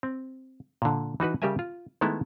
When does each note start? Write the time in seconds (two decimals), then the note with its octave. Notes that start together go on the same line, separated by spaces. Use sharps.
0.03 C4
0.82 A#2 D3
1.20 E3 D#4 F#4 B4
1.42 C#3 G3 G4 A#4 E5 G#5
1.59 F4
2.01 D#3 G#3 A3 B3 E4